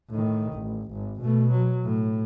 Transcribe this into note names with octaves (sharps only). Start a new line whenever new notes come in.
A2 D#3
A1
G#1
B2 A3
F#3
A2